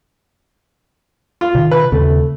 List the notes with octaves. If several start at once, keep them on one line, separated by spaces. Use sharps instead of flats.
F4
C3 D#3
B4
D#2 C#3 A3 C4